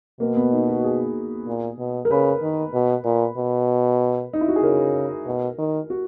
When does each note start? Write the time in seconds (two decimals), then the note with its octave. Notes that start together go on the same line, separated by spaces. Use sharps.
0.20 B2 A#3
0.36 B3
0.52 D#4
0.68 F#4
0.84 G#4
1.47 A#2
1.79 B2
2.05 A#4
2.10 C#3 B4
2.42 D#3
2.74 B2
3.05 A#2
3.37 B2
4.33 D#4
4.41 E4
4.48 F#4
4.56 G#4
4.63 C#3 A#4
5.26 B2
5.58 D#3
5.90 F#4